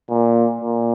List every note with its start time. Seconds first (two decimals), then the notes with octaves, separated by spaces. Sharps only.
0.09 A#2
0.61 A#2